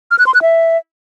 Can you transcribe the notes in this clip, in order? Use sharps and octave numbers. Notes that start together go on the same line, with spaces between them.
F6
F#6
C6
F#6
E5